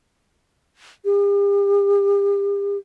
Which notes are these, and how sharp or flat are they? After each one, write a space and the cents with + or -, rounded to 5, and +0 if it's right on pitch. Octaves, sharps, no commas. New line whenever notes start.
G4 +40